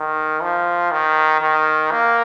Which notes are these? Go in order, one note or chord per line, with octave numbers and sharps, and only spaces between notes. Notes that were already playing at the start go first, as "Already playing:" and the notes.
Already playing: D#3
F3
D#3
D#3
A#3